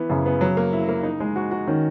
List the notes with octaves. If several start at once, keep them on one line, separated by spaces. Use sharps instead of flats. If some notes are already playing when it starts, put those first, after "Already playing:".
Already playing: E3 B3
F#2 C#3
B3
F#3
A#3
E4
A#3
D#4
G#3
F#4
F#4
D#3 C#4